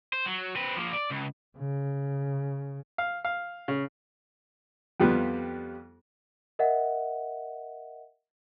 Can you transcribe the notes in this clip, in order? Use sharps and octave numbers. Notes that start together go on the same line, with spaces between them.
C5
F#3
C4 B4
F3 A#3
D5
C#2
C#3
F5
F5
C#3
F2 G3 B3 F4
A#4 D#5 E5 F#5